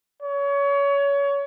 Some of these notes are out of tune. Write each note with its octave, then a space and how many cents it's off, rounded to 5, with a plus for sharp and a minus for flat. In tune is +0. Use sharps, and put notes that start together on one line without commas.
C#5 +25